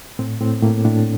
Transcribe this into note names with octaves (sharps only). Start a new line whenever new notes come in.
A2 C4
A2 C4
A2 A#3
A2 D4